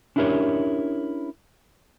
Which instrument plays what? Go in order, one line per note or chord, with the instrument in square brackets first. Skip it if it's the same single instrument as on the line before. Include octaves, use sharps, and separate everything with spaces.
[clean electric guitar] C#4 D4 E4 G4 A#4 C#5